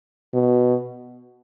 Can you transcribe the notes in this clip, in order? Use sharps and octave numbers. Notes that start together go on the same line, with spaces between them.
B2